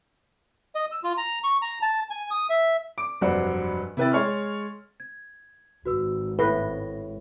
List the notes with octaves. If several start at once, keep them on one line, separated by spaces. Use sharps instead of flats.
D#5
E6
F4
A#5
C#6
A#5
A5
G#5
D#6
E5
D6 D7
F1 G2 F#3 D4 C5 F#5
C3 E4 B4 G5 A6
G#3 C#5 C6 F6
G#6
G#1 F#4 B4 E6
A2 B4 A#6 C7 G7